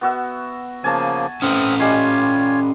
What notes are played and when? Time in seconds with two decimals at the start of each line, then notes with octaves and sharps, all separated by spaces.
0.01 B3 F#4 E5
0.84 C#3 F3 A#3 G#5 A5
1.42 C4 C#4 A4 B4 D#6 F6
1.79 G3 G#3 F4 C#5 C6